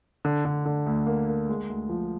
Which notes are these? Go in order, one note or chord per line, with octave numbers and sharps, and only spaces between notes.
D3
D3
D3
D2
A#3
A#3
G#3
D2
F3